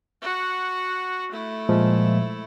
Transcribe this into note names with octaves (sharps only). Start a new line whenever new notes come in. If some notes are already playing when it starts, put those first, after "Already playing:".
F#4 F#5
A3 E4
A#2 F3 G#3